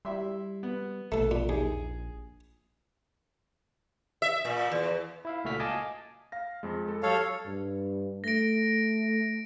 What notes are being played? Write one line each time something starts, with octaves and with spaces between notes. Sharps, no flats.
G3 E4 E5 C6
B3
A#1 A3 A4
A#2
D#2 G#4
E5
A#2
E2
E4 E5 F5
C#2 A#2 A3 F#4 F6 B6
D#5 F5 G#5 A5 D6
F5 A#6
F2 G#3
A4
F#3 G4 A4 C#5 F5
G2
A3 A#6 D7